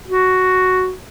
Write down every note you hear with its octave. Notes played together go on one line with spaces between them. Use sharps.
F#4